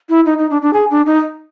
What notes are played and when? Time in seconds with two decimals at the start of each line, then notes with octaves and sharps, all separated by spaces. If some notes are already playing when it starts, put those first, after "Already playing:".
0.09 E4
0.26 D#4
0.38 D#4
0.50 D4
0.62 D4
0.73 G#4
0.90 D4
1.06 D#4